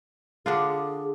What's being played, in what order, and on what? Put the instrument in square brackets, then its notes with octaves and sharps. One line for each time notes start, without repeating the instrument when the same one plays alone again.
[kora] D3 D4 F4 [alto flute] G#4